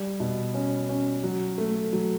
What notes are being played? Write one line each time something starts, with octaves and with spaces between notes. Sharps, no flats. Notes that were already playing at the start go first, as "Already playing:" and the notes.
Already playing: G3
B2
C#4
C#4
F#3
A3
F#3